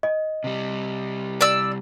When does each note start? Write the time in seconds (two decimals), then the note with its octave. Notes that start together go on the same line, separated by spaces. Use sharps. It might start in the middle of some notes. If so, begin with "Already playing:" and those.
0.03 D#5
0.44 C3 G3
1.41 D5 E6